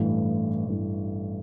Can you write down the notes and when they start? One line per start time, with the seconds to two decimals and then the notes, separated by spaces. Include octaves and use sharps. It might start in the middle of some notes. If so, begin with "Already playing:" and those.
Already playing: A1 G2 E3 A3
0.66 A1 G2 E3 A3